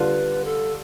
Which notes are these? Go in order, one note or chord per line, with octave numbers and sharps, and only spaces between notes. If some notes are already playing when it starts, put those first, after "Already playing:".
Already playing: D3 G3 D4 F4 B4
A4